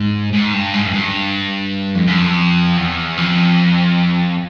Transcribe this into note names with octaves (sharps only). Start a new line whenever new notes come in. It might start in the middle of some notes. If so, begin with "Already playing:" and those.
Already playing: G#2
G#2
G2
G#2
F#2
G2
F2
F#2
F2
E2
F2